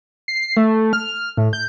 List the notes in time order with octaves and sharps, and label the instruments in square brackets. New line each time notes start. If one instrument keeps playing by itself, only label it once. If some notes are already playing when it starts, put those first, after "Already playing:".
[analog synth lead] C7
A3
F6
A2
G6